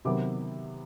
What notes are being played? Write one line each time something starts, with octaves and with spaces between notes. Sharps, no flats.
C3 D#3 F#3 B3 D6